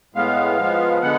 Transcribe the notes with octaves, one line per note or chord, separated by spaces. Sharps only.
A2 G#3 B3 F5
F3 G#3 B3
D3 G#3 B3 F#5